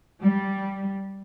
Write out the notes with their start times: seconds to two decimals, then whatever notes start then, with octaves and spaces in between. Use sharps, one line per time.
0.22 G3